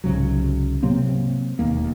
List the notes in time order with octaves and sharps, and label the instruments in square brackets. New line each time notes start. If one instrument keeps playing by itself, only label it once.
[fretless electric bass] C2 G#2 C#3 F#3
C3 F#3 A#3 C4
E1 D#2 A#3